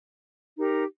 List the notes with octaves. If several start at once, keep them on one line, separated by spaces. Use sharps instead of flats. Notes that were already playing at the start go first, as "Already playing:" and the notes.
D#4 G4 A#4